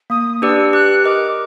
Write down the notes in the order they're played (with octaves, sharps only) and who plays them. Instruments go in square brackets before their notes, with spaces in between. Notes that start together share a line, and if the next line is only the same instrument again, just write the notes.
[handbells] A#3 [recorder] D#6
[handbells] D4 G4 B4 D5 [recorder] E6
[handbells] G4 [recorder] F#6
[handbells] A#4 D#5 [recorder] D6